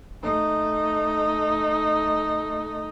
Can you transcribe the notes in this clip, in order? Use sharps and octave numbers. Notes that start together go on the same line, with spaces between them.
A3 D#4